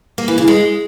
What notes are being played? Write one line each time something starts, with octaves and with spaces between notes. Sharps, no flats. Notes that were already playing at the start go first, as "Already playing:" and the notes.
A#3
E3
C#3
G#3